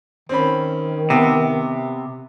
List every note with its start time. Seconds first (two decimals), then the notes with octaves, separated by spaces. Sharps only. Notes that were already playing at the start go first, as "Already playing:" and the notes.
0.29 D#3 C4 C#4 B5
1.10 C3 B3